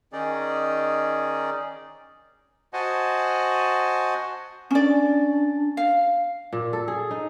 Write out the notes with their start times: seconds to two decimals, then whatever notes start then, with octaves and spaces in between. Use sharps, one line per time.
0.13 D#3 C#4 D#4 G#4 D5
2.73 F#4 C5 D#5 F#5 G#5 A5
4.71 C#4 D4 D5
5.77 F5
6.53 A#2
6.73 A4
6.88 G#4
7.11 D#4